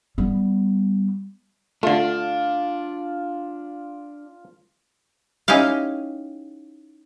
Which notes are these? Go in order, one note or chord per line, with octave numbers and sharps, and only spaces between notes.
G3 B3
D3 A3 D4 F4
C#4 D#4 E4 G4 F5